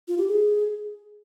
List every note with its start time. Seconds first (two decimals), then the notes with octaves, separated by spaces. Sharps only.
0.08 F4
0.18 G4
0.28 G#4